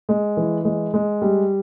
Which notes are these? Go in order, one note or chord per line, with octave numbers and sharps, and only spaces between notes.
G#3
E3
G#3
G#3
G3